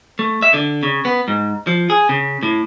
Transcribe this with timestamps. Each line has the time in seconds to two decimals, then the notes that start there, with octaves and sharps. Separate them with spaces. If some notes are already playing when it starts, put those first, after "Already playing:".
0.19 A3
0.42 E5
0.54 D3
0.83 C#3
1.05 B3
1.28 G#2
1.67 F3
1.90 G#4
2.09 C#3
2.43 A2